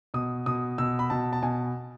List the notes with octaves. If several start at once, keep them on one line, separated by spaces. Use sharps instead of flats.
B2 D#6
B2 D#6
B2 E6
B5
B2 A5
A5
B2 G#5